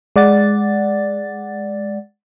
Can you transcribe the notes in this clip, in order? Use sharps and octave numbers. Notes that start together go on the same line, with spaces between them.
G#3 D5 F#5 A6